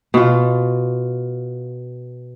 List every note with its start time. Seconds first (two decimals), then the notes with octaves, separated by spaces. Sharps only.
0.14 B2 F4